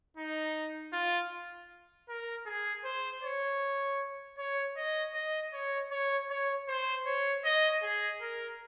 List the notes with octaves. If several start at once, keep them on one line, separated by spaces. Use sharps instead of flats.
D#4
F4
A#4
G#4
C5
C#5
C#5
D#5
D#5
C#5
C#5
C#5
C5
C#5
D#5
G#4
A#4